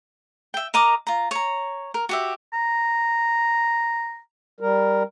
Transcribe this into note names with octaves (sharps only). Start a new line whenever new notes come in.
E5 G5
A#4 D#5 A#5 D6
F4 A#5
C#5 A#5
A#4
F#4 G4 E5
A#5
G3 A#4